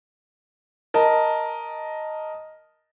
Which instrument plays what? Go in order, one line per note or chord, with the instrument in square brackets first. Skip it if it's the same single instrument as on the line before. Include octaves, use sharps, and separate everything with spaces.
[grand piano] A#4 D#5 A5